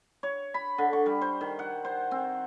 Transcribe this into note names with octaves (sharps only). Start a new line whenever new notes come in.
C#5
B5
D3
C#6
G3
C5
D#3
F#5
C5
C4